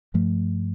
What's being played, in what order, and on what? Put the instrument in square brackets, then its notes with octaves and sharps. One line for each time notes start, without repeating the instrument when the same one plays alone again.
[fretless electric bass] G2 F3 A3